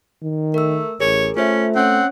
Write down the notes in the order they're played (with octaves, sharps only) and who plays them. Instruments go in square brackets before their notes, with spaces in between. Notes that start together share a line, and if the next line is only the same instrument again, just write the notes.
[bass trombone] D#3
[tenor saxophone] A3 [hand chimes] A#4 E6
[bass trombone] A1 [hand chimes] G#4 A#4 [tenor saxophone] C#5
[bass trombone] A3 [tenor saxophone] C#4 [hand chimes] F4 C5 E5
[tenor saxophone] C4 [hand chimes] C#4 C#5 [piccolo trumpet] F#5